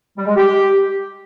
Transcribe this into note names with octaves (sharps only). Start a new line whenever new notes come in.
G3
G#3
G4